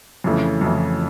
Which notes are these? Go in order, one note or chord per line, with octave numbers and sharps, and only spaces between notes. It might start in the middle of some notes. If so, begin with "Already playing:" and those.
F2 C#3 E3 A3
F2 C#3 E3 A3